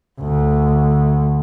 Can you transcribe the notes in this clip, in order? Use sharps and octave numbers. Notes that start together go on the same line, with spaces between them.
D2